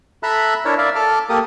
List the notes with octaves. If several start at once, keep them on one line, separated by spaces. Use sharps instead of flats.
A4 E5 A#5 B5 E6 F#6
D4 E4 A#4 C#5 A5
A#4 D5 E5 F5
A4 A5 D6 F6
A#3 G4 A4 A#4 D#6